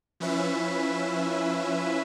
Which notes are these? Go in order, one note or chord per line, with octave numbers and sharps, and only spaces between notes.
F3 C#4 E4 B4 E5